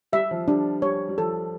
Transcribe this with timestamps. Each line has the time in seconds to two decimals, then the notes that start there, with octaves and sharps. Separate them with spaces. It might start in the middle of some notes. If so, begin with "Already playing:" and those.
0.12 G3 E5
0.31 F3
0.48 G3 D4
0.82 G3 C#5
1.09 G3
1.17 F3 A4